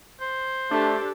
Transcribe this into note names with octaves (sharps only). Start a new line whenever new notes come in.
C5
A3 D4 G4 A4